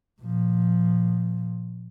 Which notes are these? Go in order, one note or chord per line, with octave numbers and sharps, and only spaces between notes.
A#2 F3